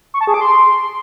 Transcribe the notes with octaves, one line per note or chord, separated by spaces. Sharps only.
C#6
A5
G#4
D6
C6